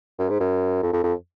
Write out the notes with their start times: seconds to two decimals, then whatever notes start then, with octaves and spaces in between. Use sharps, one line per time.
0.19 F#2
0.30 G#2
0.40 F#2
0.83 F2
0.93 F2
1.04 F2